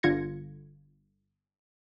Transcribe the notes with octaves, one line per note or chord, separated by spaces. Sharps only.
G1 D3 F4 G#6 A#6 C#7